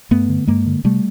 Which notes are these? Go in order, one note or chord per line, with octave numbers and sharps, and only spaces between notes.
G2 A3 B3
D3
G2 G#3 A#3
D3
C3 G3 A3